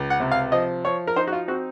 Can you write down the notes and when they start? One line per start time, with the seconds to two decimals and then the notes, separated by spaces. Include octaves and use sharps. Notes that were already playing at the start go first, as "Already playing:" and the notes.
Already playing: C#2
0.10 F#5
0.20 C3
0.31 F5
0.52 F3 D#5
0.85 F3 C#5
1.07 A#4
1.16 D#4 C5
1.27 F#4
1.33 F4
1.48 C4 F#4